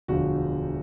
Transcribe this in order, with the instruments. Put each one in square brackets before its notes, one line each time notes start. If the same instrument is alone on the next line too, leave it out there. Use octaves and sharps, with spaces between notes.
[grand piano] E1 D2 D3 F3 F#4